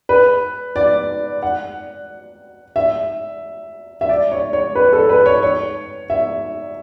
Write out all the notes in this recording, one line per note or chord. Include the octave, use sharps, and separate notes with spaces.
B4
D5
F#5
E5
E5
D5
C#5
C#5
B4
A4
B4
C#5
C#5
E5